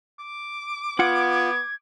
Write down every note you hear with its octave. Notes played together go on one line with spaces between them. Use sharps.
D6
B3 F4 F#5 G#6